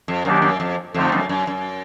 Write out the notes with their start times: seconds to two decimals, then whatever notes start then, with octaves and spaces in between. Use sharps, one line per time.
0.08 F2
0.25 F#2 D#3 F#3 A#3 D4 G4
0.42 F#2
0.60 F2
0.94 F2 D3 F3 A3 C4 D#4
1.12 F#2
1.29 F#2
1.47 F#2